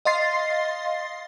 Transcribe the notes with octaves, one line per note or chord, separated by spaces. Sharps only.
D#5 F5 C6 A6 C7